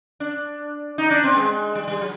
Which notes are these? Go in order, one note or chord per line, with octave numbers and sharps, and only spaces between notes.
D4
D#4
D4
C4
G#3
G3
G3
F#3